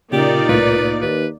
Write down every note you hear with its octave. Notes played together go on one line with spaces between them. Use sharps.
A#2 C#3 A#3 D#4 G4 D5
C2 A2 F4 B4
D#2 B4